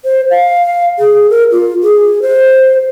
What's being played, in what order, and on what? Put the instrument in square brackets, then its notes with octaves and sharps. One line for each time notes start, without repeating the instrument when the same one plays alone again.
[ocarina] C5
F5
G#4
A#4
F4
G#4
C5